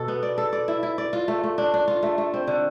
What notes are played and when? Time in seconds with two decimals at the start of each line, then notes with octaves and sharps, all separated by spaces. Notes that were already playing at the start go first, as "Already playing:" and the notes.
Already playing: B2 A4
0.08 B3
0.23 D5
0.38 A4
0.53 D5
0.68 E4
0.83 E4
0.98 D5
1.13 F4
1.28 A3
1.44 A3
1.58 D4
1.74 D4
1.88 F4
2.03 A3
2.18 A3
2.34 C4
2.47 D3